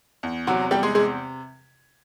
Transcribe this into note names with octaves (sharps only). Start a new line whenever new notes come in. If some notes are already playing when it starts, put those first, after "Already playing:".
E2
C3 F#3 F#4
E2 G3 G4
G#3 G#4
C3 G#3 G#4